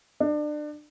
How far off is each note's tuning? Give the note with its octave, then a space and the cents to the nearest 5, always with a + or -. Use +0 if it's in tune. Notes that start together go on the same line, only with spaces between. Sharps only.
D4 +30